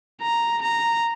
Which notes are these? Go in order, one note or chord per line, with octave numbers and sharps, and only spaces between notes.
A#5
A#5